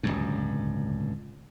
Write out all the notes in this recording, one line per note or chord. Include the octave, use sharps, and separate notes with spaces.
D1 G#1 C#2 G2